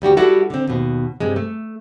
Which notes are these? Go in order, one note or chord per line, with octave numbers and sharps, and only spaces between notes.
D2 G3 F#4 G4
G3 E4 F#4 A4
D3 C4
D#2 B2
G2 C3 G#3
A3